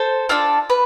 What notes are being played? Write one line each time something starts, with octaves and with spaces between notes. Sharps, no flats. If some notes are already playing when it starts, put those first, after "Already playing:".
Already playing: A4 C5
D4 F4 A4
B4